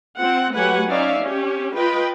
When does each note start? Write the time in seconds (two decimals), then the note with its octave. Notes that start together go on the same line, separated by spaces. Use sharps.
0.17 C4 F4 F#5
0.55 F#3 A3 G4 B4 F#5 G#5
0.89 C#4 D#4 D5 E5 F5
1.21 C#4 G4
1.75 F4 B4 D#5 G5